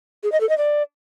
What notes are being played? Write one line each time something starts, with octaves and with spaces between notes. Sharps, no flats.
G#4
D#5
A4
D#5
D5